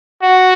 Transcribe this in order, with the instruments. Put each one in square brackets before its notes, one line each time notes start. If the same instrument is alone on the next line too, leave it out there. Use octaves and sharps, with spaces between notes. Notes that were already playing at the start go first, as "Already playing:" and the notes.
[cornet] F#4